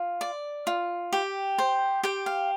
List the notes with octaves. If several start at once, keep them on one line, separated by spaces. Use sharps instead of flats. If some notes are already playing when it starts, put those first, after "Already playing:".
Already playing: F4
D5
F4
G4
C5
G4 G5
F5